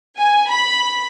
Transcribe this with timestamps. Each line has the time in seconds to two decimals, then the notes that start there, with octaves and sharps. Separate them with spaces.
0.18 G#5
0.49 B5